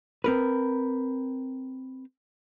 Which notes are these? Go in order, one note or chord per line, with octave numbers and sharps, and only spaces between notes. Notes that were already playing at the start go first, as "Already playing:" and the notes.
C4 A#4 B4